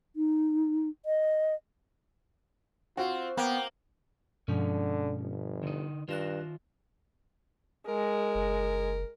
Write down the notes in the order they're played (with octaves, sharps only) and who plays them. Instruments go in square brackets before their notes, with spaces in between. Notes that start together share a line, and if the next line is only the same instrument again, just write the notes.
[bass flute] D#4
D#5
[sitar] C4 [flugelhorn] F4 [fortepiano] F#4
[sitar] A#3 [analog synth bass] B3 [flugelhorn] G5
[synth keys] G2 B2 F3 [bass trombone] D3 [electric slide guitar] G#3 C#4
[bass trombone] G1
[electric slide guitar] D3 D#4
[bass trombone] G2 [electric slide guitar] D#3 F4 [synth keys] F#6 A#6 E7
[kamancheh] G#3 [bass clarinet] A#4
[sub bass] F#1